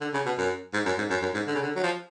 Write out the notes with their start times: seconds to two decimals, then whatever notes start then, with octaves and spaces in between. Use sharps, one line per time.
0.01 D3
0.14 C#3
0.26 B2
0.37 F#2
0.74 G#2
0.86 F#2
0.98 G#2
1.10 F#2
1.22 F#2
1.34 G#2
1.47 D3
1.55 C#3
1.63 D3
1.76 F#3
1.83 F3